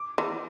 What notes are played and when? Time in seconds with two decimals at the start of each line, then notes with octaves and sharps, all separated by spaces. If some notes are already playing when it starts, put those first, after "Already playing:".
Already playing: D6
0.18 E3